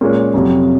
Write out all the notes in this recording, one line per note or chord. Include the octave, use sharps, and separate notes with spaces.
A#2 G#3 C#4
F2 C3 F#3